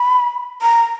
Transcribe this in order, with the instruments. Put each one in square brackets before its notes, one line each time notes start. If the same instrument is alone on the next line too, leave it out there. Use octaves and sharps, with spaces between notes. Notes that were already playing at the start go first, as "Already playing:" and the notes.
Already playing: [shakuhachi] B5
A#5